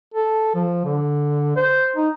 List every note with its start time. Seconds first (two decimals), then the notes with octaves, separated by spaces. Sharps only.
0.14 A4
0.55 F3
0.85 D3
1.56 C5
1.96 D#4